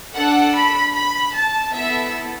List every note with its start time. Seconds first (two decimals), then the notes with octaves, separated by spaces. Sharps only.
0.13 D4 A4 F#5
0.53 B5
0.93 B5
1.33 A5
1.72 B3 E4 A4 E5